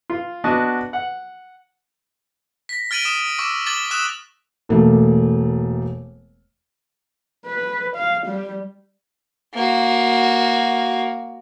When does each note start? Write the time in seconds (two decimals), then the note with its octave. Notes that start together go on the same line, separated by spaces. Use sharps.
0.10 F4
0.44 B3 D4 F#4 D#5 A5
0.93 F#5
2.69 A#6 B6
2.91 F6 A6 D7 D#7 F#7
3.05 D#6 E7 F#7
3.39 C#6 D6 E6
3.66 D6 A6 F#7 G7
3.91 D#6 E6 F#6 E7
4.69 E1 A3 A#3
7.46 B4
7.96 F5
8.26 G3
9.54 A#3 F#4